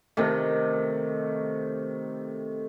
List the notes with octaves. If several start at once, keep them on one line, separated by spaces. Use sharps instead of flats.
C3 D#3 A3